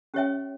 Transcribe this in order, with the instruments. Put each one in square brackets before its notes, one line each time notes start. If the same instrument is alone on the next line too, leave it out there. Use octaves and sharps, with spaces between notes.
[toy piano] C#4 G4 C#5 E5 G5